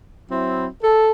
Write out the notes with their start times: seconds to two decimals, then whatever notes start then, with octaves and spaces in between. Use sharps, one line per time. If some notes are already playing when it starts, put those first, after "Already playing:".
0.30 F#3 C4 E4
0.82 A4